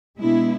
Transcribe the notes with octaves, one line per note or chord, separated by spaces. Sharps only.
B2 G#3 B3 D4 E4